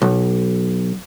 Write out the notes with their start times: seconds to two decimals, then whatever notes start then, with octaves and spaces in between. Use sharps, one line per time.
0.02 B1